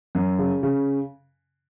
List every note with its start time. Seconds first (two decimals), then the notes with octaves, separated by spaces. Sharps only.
0.15 F#2
0.39 C#3
0.63 C#3